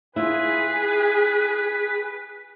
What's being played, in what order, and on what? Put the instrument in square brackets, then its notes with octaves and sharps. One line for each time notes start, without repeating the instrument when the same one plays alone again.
[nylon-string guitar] E4 F4 [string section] G#4 [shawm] B4